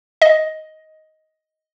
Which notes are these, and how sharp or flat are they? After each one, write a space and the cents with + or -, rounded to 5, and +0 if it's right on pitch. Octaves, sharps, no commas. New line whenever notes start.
D#5 +10